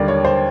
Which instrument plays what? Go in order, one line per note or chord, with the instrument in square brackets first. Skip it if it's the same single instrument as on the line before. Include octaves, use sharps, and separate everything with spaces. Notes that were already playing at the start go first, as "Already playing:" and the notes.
Already playing: [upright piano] D#2 D3 G3 A#3 D5
C#5
C5